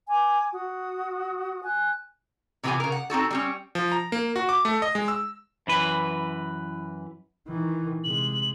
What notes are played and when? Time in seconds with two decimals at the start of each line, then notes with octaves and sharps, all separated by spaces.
0.09 G#5 D6
0.53 F#4 D#6
1.64 G#5 F#6
2.63 C3 E3 B3 F4 G4 G#5
2.80 C#3 A#4
2.92 F#5
3.10 C4 D#4 F#4 A4
3.31 G3 C4 C#4
3.75 F3
3.92 A#5
4.12 A#3
4.36 F#4
4.49 D6
4.65 A3
4.82 D#5
4.95 G#3
5.08 E6
5.67 F#2 E3 B4
7.48 D#3 E3
8.04 C3 G#3 F#7